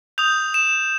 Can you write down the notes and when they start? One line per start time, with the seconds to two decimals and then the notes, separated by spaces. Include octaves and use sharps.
0.18 D#6 G6 F7
0.54 E7